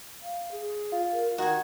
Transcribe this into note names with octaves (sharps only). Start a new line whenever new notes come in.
F5
G#4
F4
A#4
D#3 F#4 A#4 G#5